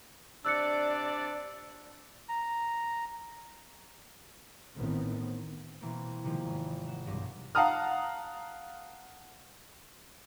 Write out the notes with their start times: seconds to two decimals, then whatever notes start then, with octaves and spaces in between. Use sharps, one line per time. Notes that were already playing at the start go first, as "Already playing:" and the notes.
0.45 C3 D4 D5 E6 F#6 C#7
2.29 A#5
4.77 A1 A2 D#3 B3 C4
5.81 B2 E3 A#3 C4
6.24 C3 D#3 F3 G#3 A#3
6.45 G#1
6.88 F#5 E7
7.05 B1 G2 F3 A#6
7.55 F5 F#5 A5 A#5 D#6 F6